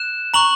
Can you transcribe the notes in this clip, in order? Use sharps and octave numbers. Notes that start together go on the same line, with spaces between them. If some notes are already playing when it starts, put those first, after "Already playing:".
Already playing: F#6 E7
A#5 C#6 F#6 F#7